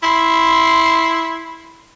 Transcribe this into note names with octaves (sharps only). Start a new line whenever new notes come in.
E4 C6